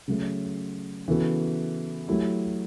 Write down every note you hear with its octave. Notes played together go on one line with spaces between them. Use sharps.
C#3 F#3 A3
C#3 E3 B3 F#4 A4
F#3 A3 E4 G4